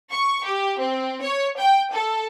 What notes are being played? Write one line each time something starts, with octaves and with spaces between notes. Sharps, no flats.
C#6
G4
C4
C#5
G5
A4